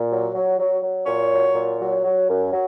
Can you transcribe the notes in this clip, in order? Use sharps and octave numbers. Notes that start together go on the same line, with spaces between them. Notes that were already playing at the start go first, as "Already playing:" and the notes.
Already playing: A#2
F#3
F#3
F#3
F#3
A#2 C#5
F#3
A#2
F#3
F#3
F#2
F#3